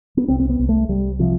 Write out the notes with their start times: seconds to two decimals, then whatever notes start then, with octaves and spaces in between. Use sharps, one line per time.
0.17 B3
0.28 C2 C4
0.40 C4
0.49 B3
0.60 C2
0.69 A3
0.89 C2 G3
1.19 C3 F3